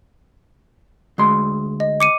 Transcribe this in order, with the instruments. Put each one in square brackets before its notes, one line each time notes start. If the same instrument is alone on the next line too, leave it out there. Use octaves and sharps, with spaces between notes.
[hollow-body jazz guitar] D2 G#3 C6
[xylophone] D#5
D6 C#7 D#7